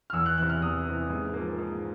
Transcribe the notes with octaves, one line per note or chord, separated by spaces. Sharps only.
F6
E2 E6
F#6
C3 E3 F#6
F6
E2 D#6
C3 E3
G#2
F3 A#3
G#2